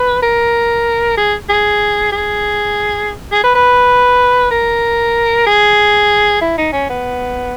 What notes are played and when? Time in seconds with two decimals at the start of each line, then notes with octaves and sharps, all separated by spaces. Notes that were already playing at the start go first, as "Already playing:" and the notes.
Already playing: B4
0.22 A#4
1.17 G#4
1.49 G#4
2.12 G#4
3.32 G#4
3.44 B4
3.55 B4
4.51 A#4
5.47 G#4
6.41 E4
6.58 D#4
6.73 C#4
6.90 B3